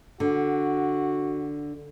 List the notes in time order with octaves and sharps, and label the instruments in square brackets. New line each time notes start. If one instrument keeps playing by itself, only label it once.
[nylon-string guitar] D3 [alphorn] F#4